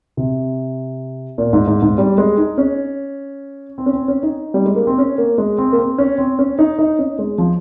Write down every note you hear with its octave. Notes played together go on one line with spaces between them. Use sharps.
C3
A#2
G#2
G#2
G#2
G3
G#3
D#4
C#4
C4
C#4
C4
C#4
D#4
G3
G#3
A#3
C4
C#4
A#3
G#3
C4
A#3
C4
C#4
C4
C#4
D#4
D#4
C#4
G#3
F3